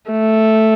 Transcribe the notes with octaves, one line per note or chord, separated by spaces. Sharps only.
A3